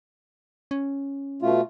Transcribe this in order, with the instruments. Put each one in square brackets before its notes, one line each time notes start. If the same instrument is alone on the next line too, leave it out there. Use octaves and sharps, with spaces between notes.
[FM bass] C#4
[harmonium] B2 A3 F4